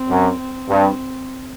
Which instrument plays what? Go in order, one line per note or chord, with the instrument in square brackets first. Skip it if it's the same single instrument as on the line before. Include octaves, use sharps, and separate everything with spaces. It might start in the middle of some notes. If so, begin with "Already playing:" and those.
Already playing: [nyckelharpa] C4
[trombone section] F#2
[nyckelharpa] C4
[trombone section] G2